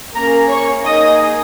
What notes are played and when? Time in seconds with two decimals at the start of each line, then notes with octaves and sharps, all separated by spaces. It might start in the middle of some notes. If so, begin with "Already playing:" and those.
0.16 A#3 C#4 G#4 A#4 A#5
0.50 C#5 C#6
0.85 A#3 D#4 G#4 D#5 D#6